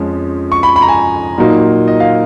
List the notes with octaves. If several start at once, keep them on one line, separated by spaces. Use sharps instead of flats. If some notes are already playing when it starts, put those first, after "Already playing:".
Already playing: F2 F3 G#3 C#4
C#6
B5
B5
A#5
G#5
A#2 F#3 A#3 D#4
D#5
F5